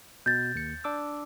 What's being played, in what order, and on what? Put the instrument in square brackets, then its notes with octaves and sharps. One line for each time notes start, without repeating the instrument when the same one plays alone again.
[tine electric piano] B2 [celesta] G6 A6
[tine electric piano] D#2 C#7
D4 D6 E6